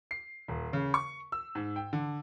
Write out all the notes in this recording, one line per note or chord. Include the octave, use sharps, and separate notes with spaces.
C7
D#1
C#3
C#6
E6
G#2
G5
D3